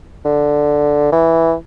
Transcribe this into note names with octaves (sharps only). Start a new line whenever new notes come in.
D3
E3